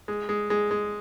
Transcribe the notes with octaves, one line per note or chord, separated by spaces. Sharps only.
G#3
G#3
G#3
G#3